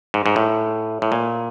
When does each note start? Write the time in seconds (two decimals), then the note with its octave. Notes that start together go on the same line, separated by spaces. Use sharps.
0.14 G#2
0.26 G#2
0.36 A2
1.02 A2
1.12 A#2